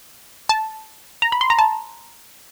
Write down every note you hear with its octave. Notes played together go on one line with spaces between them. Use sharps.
A5
A#5
B5
C6
A#5
A5